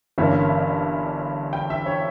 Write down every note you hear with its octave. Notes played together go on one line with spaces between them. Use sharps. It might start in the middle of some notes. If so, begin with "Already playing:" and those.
G1 G2 E3 A#3 C#4 E5
G5
E5
C#5